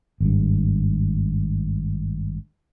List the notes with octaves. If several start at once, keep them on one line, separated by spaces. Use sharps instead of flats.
G#1 G2